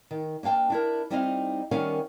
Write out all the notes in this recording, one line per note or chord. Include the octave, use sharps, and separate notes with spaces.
D#3
A#3 D4 F5 G5 A5
D4 E4 A#4
G3 C4 D#4 E4 D#5 F5
D#3 G3 B3 C#4 A#4 F5